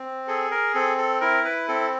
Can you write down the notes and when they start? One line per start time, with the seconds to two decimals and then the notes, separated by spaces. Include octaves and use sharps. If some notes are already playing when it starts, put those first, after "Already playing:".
Already playing: C4
0.28 G#4 A4
0.51 A#4
0.74 C4 A4
0.98 A4
1.21 E4 A#4
1.45 B4
1.68 C4 A4